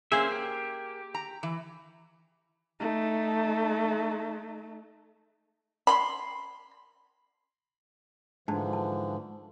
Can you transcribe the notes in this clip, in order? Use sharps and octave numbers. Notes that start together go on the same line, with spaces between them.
A#3 C#4 G#4 C5 E5
G4
A#5
E3
A3 D#4
B5 C6
G#2 D3 E3 F3 D4 A5
A5